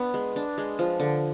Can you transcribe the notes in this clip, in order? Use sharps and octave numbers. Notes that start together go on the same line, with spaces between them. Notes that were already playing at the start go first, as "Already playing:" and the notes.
Already playing: B3 D4
G#3
D4
G#3
F3
D3